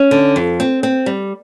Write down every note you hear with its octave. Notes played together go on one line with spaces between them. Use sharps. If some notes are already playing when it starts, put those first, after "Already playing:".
Already playing: C#4
D3
F2
C4
C4
G3